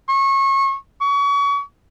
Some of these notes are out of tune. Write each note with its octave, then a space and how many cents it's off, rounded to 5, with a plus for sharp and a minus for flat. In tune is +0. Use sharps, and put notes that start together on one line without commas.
C#6 -25
C#6 +35